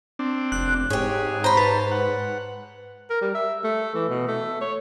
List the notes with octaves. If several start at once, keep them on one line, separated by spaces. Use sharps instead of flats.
C4 D4
F1 F#6
G#2 G4 G#4 C#5
C5 C#5 A#5 B5
B4 A5
F#5
A#4
G3
E5
A3
E3
B2
A3
C#5